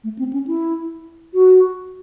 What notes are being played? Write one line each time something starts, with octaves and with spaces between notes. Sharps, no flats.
A3
C4
C#4
E4
F#4